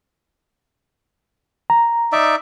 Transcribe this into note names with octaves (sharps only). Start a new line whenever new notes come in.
A#5
D#4 D5 E5